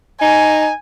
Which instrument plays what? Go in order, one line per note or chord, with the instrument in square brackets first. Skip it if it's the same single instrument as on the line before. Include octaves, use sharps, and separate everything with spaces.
[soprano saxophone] D#4 [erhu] G#5